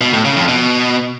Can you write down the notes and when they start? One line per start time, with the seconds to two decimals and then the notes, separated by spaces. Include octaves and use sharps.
0.01 B2
0.13 A2
0.25 C#3
0.36 F2
0.48 B2